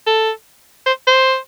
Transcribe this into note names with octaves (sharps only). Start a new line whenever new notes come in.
A4
C5
C5